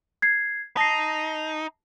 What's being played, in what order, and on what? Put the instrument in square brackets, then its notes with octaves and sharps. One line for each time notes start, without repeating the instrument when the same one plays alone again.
[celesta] G#6 C7
[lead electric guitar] D#4 [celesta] A5 A#6 C7